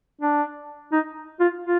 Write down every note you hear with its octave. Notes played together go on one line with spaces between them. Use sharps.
D4
D#4
F4
F4